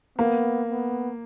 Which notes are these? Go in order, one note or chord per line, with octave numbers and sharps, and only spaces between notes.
A#3 B3
B3